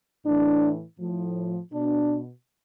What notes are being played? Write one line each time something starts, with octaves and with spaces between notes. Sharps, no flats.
A2 E3 D4
A2 F3
B2 D4